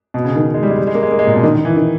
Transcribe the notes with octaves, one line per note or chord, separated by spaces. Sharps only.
B2
C#3
D#3
G#3
G3
G#3
G3
G#3
A#3
G#3
A#3
G#3
A#2
B2
D#3
D#3
E3
D#3